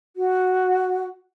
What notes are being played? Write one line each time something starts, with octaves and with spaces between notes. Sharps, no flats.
F#4